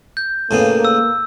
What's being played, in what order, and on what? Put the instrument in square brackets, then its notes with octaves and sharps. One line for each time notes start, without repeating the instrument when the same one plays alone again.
[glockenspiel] G6
[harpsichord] A2 C#3 B3 [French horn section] A#3
[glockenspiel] E6